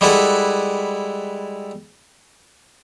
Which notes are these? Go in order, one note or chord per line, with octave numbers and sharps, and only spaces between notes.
G3 G#3 E4 A4 B4 F#5